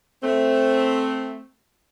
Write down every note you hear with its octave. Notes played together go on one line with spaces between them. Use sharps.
A3 C4